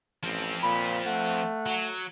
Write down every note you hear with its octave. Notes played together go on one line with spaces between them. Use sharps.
A1 F3 C4
A#2 B5
A3 F#5
F#3